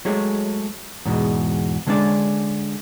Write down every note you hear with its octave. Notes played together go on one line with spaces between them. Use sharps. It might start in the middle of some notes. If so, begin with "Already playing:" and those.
F#3 G#3 A3 G#4 C#5
E2 G#2 B2
D3 G#3 C#4 D4 D5